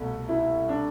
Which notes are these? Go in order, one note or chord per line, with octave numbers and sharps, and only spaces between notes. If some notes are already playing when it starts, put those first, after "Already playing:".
Already playing: C2 B2 A3
E4
D4